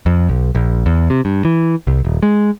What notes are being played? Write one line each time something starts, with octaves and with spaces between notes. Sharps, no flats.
F2
B1
A#1
E2
C3
G2
E3
C2
D#1
G#3